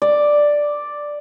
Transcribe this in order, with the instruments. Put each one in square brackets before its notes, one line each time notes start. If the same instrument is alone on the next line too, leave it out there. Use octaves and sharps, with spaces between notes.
[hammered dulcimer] D5